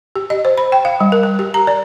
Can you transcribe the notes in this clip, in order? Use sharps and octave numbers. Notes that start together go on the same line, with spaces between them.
G4
D#5
C5
B5
G5
F5
G3
A#4
A#4
G4
A#5
D5